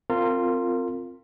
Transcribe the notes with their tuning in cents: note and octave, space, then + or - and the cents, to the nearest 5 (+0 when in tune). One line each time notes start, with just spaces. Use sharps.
C4 +0 F4 +0 A#4 -30